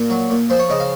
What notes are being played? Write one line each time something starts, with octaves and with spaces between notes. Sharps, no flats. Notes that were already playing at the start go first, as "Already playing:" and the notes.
Already playing: A#2 A#4
F#3
A#2
F3 C5
C#5
C#3 D#5
F5